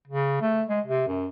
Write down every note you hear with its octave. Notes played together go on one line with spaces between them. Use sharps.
C#3
A3
G#3
C3
F#2